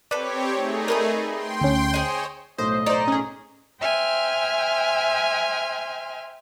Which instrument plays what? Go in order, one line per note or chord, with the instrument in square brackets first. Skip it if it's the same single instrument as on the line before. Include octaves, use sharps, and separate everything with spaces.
[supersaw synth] C4 G4 C#5 [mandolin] A4 B4 [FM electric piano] D5
[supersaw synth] A3 D#4 G#4
[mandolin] A#4 B4 D#6
[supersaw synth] G5 C6
[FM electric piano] D2 C#4
[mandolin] G#4 D#5 [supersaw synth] C5 C#5
[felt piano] B1 A2 A3 [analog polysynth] C5 [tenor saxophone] D#5
[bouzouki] D#4 [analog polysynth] C5 D5
[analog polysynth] C#4 G#4
[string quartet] C5 E5 G5 G#5 F6